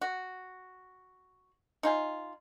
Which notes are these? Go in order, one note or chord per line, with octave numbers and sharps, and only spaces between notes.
F#4
D#4 F4 G#5